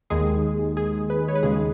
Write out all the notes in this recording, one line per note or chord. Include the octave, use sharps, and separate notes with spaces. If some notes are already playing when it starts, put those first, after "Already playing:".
D#2 D#3 G#3 G#4
G#4
B4
C#5
B4
D#2 C#3 G#3 G#4